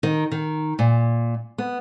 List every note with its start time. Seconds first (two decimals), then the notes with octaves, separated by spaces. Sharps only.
0.03 D#3
0.32 D#3
0.79 A#2
1.58 B3